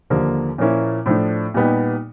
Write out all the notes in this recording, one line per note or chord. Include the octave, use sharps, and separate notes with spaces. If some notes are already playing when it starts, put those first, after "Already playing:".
D#2 D3 F3 A#3
A#2 F3 A#3 C#4 E4
A2 F3 A3 D4
A#2 G3 B3 D#4 G4